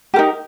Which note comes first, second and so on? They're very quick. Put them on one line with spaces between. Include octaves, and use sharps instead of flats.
G4 A#4 D#4